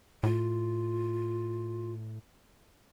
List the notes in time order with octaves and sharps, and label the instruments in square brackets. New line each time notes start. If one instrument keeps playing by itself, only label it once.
[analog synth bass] A2 [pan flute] F4